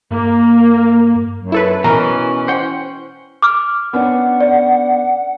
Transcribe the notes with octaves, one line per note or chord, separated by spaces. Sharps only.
G2 A#3
F#2
E4 A4 B4
B2 E3 C#4 A#4
C5 F#5 G5
D6 F6
B3 C#4 D4 F#5
D5